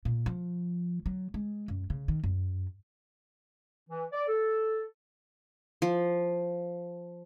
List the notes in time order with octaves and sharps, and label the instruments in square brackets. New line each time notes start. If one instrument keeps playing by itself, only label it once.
[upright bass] A#2
F3
F#3
G#3
F#2
C#3
D#3
F#2
[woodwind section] E3
D5
A4
[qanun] F3